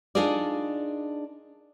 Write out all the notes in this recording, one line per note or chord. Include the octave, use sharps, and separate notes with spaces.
D4 D#4 F4 G#4 A#4 D5